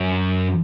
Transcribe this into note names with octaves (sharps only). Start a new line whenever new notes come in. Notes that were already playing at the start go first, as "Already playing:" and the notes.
Already playing: F#2